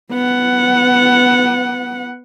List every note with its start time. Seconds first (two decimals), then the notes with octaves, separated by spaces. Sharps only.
0.11 B3 F#5